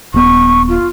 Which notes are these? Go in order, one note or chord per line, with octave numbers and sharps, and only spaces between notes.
D#1 B3 C#6
F4